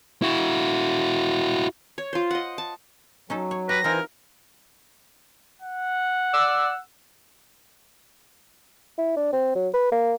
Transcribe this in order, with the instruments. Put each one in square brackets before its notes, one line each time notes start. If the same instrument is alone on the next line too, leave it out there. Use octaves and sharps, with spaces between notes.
[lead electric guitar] E4 F#4
[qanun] C#5
F4 C5
D#5 F#5
A5
[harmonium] F#3 [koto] C#4 D#4 A4
[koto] C#5
[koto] G4 [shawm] B4 [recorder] A#6
[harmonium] E3 C5 G#5 [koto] C4 D#4 F4 [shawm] A#4
[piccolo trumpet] F#5
[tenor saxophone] D5 [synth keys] E6
[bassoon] E4
D4
C4
F#3
B4
A#3